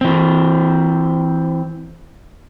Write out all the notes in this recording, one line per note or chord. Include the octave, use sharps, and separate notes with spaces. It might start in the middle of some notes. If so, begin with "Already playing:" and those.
E3 C4